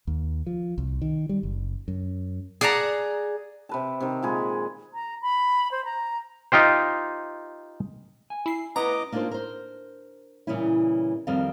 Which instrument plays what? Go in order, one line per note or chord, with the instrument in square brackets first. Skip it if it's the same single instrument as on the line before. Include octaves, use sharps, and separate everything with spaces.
[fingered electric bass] D#2
F3
C2
D#3
G3
F#1
F#2
[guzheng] G#4 D5 F#5 A5 A#5
[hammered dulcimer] C3 B4 A5
C3 D#3
A#2 G#3 G#4 B5
[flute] A#5
B5
C5
A#5
[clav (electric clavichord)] D#4 F4 G4 C5
[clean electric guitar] G#5
[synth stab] E4 C7
[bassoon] B3 [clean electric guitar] C#4 E4 B4 [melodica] D#5 D6 [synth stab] A#5
[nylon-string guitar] A#3 D4 D#4 F4 A#4 C5
A#4 C5
A#2 C#3 E3 G3 C#4 E4
F2 D#3 G3 C4 A4 F5